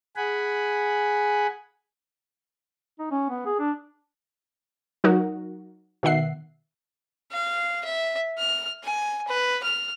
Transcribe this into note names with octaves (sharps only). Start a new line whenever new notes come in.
G#4 F#5 G#5 B5
D#4
C#4
B3
G#4
D4
F#3 D#4 F#4 A#4
B2 D#3 E5 F#5 C7
F5
E5
F6
G#5
B4
F6